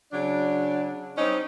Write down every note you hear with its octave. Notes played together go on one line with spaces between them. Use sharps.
C#3 F#3 D4
G3 C4 C#4 D#4